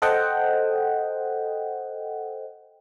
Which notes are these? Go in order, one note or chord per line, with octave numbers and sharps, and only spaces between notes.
A4 C5 D#5 F#5 G5